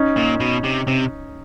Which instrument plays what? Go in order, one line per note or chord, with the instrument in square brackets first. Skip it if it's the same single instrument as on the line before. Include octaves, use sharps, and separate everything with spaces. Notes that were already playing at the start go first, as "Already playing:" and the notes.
Already playing: [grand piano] C#4 D#4
[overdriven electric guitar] A#2
B2
C3
C3